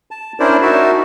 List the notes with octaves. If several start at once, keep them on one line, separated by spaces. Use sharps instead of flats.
A5
C#4 D4 E4 A#4 C5 D5
D#4 F#4 A#4 E5 A5